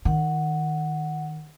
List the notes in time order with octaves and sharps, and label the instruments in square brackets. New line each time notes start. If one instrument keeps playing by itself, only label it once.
[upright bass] D#3 [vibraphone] F#5